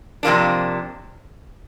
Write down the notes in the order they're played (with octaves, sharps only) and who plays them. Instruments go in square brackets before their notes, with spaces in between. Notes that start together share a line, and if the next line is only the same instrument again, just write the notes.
[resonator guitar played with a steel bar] F2 C3 F3 A#3 D4